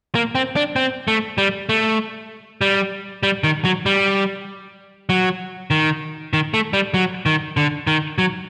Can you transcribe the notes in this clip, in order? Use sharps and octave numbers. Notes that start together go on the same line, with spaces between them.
A#3
C4
D4
C4
A3
G3
A3
G3
G3
D#3
F#3
G3
F#3
D#3
D#3
A3
G3
F#3
D#3
D3
D#3
F#3